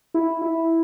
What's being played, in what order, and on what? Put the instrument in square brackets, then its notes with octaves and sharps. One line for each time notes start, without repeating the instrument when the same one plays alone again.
[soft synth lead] E4
E4